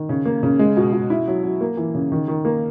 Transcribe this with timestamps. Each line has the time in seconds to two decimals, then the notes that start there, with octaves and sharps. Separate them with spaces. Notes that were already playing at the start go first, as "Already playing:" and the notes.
Already playing: D#3
0.09 C#3
0.25 A#3
0.43 C#3
0.59 G#3
0.77 B2
0.93 B2
1.10 E4
1.28 F#3
1.44 F#3
1.61 A#3
1.77 E3
1.95 C#3
2.12 D#3
2.28 D#3
2.45 A#3